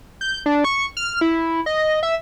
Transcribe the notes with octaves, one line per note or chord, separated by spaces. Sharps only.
G6
D4
C#6
F6
E4
D#5
E5